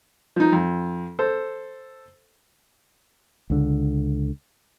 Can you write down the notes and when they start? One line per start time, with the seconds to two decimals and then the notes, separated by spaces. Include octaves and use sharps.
0.36 F3 D#4
0.52 F2
1.19 A4 C5
3.50 C#2 D3